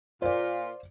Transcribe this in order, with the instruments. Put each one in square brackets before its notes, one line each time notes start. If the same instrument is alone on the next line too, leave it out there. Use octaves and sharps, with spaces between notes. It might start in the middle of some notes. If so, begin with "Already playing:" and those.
[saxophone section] A#2 F4 [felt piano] C5 D5